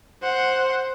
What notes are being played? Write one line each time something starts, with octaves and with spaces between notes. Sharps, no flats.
C5 F#5